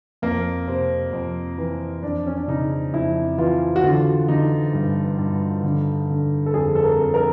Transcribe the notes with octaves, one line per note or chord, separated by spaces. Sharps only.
F2 A#3
C3 C4
F2
E3
F2 D4
C#4
D4
C#3 D#4
F2 E4
E3 F4
F#4
D3 F4
D3 D#4
G2
G2
D3
D3
A4
F2 G#4
A4
A#4
F2
A#4